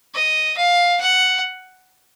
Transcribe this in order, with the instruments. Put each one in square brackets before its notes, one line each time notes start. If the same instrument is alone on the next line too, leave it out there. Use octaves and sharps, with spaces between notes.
[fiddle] D#5
F5
F#5